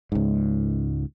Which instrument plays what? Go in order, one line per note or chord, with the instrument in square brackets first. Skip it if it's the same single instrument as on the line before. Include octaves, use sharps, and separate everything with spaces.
[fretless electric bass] C#2 G#2